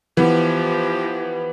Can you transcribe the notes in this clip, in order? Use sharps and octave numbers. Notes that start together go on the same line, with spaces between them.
E3 F3 B3 G4